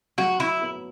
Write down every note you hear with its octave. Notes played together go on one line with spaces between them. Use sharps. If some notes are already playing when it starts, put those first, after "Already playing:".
F#3 F#4
E4
B3